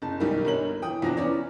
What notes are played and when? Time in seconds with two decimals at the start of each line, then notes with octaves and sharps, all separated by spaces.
0.02 F#1 A5
0.20 B1 D#3 G3 A#4
0.45 G1 A#4 C#5 F#7
0.82 E3 G5 D#6
1.02 E2 F3 D4 A#5 A#6
1.17 E3 B3 C#4 C#5 D5